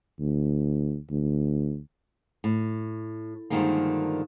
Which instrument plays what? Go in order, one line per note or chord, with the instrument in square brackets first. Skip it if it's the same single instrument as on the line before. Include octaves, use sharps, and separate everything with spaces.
[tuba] D2
D2
[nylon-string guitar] A2
G2 D3 D#3 F3 G#3 A#3